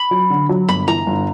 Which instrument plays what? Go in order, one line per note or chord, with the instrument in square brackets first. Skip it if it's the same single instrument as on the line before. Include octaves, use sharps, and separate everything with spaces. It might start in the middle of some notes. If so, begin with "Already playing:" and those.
Already playing: [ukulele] B5
[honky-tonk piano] F#3
D3
F#3
[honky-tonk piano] G1 [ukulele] B5
[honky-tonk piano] E3 [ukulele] A#5
[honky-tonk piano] G1